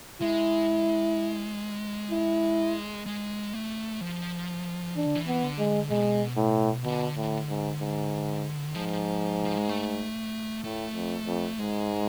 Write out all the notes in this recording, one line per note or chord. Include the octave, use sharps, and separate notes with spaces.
G#3 E4
E4
G#3
A3
F3
E3 D4
D3
E3
B3
D3
G#3
B2 G#3
A2
B2 D3
A2
G#2
G#2
G#2 F3
F3
G#3
A3
A2 A3
F2
F2
G#2 G#3